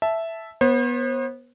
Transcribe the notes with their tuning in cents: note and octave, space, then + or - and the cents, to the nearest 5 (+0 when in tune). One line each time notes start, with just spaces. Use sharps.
E5 +0 A5 -10
B3 -15 C5 +40